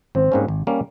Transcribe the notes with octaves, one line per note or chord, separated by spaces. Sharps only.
G#1 C4
G#2 G3 A#3 C#4
G#1
G3 A#3 C#4